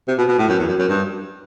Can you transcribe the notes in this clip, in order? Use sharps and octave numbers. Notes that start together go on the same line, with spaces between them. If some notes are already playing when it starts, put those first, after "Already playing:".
C3
B2
B2
A2
F#2
E2
F#2
F#2
G2